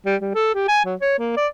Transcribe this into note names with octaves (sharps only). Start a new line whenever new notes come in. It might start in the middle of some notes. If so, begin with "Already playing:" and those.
G3
G3
A4
G4
G#5
F#3
C#5
A#3
D5